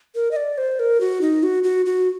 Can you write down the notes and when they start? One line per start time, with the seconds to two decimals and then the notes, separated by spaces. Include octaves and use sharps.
0.15 A#4
0.31 D#5
0.36 D5
0.58 C5
0.79 A#4
1.01 F#4
1.21 D#4
1.43 F#4
1.63 F#4
1.86 F#4